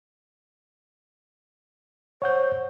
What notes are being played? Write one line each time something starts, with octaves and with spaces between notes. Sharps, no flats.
C5 C#5 F#5 G6